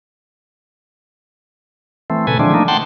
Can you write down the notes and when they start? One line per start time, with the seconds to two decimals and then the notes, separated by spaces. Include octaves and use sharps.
2.10 E3 A3 C4
2.27 A#2 C#3 A4 B4 G#5
2.39 D3 E3 F3 G#3 C4 D4
2.54 F3 A3 A#3 D4 D#4
2.68 F#5 G5 A5 C6